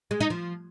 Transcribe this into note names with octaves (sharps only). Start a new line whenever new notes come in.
G#3
D#4
F3